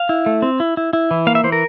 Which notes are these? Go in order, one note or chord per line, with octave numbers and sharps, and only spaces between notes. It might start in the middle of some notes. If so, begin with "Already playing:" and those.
Already playing: F5
E4
A3
C4
E4
E4
E4
E3
A#3 F5
E5
E3 C5
A#4